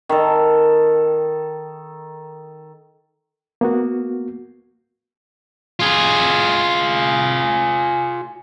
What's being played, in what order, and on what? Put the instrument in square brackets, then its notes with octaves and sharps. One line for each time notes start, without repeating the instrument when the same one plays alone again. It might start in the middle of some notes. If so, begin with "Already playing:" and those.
[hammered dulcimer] D#3 A4
[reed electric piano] A#3 B3 F#4
[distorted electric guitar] F4 G#4